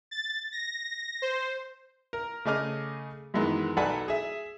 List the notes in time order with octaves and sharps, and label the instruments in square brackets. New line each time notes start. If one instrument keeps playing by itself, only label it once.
[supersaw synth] A6
A#6
C5
[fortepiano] A#4
C#3 A3 G#4 D#5 D6 F6
F#2 D#3 E3 G#3 B3
B1 A4 D5 F#5 G#5 B5
G#4 E5